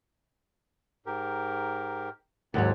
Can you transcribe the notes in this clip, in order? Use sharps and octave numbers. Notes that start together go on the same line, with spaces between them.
G#2 G4 A#4
D#2 G#2 F#3 C4 D5 F#5